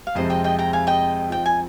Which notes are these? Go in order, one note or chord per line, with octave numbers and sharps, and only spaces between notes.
F5
F2 C3 F3 G#3 C4 C5 D#5
D#5 G5
D#5 G5
G5 A#5
F5 G#5
D#5 G5
F3 C4 F4 G5
G#5